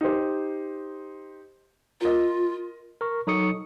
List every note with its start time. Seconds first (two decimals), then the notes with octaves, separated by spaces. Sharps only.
0.01 D#4 G4 C5
2.01 F4 A#4 D#5
3.01 A#4 C#6
3.27 F#3 D#4 A4 C#6 D#6 C#7